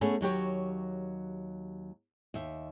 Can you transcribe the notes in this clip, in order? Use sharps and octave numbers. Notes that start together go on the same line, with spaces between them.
A3 B3 C#4 G#4 A4
D#2 F#3 G4 C#5
D#2 E5